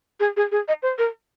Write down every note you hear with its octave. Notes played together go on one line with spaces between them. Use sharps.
G#4
G#4
G#4
D#5
C5
A#4